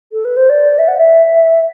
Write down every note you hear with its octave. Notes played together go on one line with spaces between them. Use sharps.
A4
B4
C5
D5
E5
F#5
E5